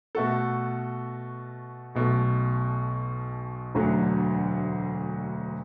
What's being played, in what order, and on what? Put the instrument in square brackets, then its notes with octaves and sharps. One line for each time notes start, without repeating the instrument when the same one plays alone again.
[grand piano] B2 A3 F#4 A4
B1 B2 A3
E1 D2 D3 F#3 A3